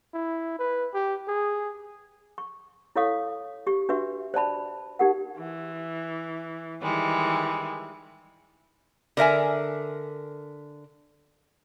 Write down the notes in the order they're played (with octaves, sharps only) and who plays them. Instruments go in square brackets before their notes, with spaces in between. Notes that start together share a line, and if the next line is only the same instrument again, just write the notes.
[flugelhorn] E4
B4
G4
G#4
[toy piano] C#6
E4 A4 C#5 F5 C#6 D#6
G4 C#6
D4 F#4 B4 E5 C#6
C5 D5 A5 B5
D#4 G4 A#4 F#5
[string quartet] E3
D#3 E3 G3 G#3
[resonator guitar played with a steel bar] D3 A#4 E5 G#5